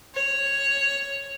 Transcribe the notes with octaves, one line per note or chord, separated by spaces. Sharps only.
C#5